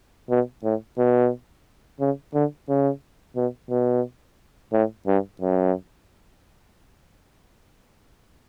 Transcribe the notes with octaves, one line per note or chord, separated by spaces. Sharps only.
B2
A2
B2
C#3
D3
C#3
B2
B2
A2
G2
F#2